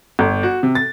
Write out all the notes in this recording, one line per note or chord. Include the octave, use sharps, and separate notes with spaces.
G1
F#4
C3
A6